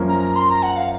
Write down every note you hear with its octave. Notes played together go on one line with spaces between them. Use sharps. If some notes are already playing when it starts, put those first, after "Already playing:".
Already playing: F#2 F3 A#3 C#4
A#5
C6
A#5
F#5
F5